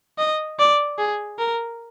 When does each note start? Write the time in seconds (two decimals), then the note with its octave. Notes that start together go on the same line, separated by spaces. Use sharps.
0.18 D#5
0.59 D5
0.98 G#4
1.38 A#4